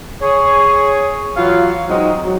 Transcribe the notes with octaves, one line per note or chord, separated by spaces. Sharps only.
G#4 C#5
E3 F#3 F4 C#5 F5
F#3 G#3 C4 D#4
F#3